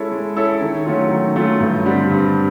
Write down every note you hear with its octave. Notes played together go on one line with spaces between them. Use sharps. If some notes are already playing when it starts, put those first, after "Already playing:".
Already playing: G#3 C#4 E4 A4 C#5
G#3
C#4 E4 A4 C#5
D#3
F#3 A3 C#4 F4
D#3
F#3 A3 C#4 F4
G2
D3 G3 C4
G2